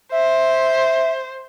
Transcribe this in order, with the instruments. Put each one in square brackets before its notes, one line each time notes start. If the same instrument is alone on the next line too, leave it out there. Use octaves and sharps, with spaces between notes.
[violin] C5 [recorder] E5